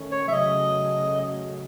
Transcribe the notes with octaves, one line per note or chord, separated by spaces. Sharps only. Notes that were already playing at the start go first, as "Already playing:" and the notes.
Already playing: D#3 A3 C#4
C#5
E5
C#3 F#3 A3 D#5